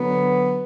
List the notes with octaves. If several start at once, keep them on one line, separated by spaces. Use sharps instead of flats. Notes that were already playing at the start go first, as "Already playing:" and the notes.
Already playing: D3 F#3 B3